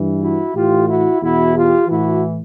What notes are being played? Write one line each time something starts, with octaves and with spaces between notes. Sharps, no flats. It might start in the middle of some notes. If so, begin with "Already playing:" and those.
Already playing: G2 E3
E4 F#4
A2 E3 F4 G4
E4 F#4
E2 B2 E4 F#4
F4 G4
A2 E3 E4 F#4